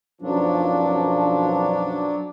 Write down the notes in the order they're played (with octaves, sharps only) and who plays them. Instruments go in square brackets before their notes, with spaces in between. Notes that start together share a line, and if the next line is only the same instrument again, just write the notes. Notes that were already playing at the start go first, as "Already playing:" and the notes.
[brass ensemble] B1 F#2 F3 [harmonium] F#3 D4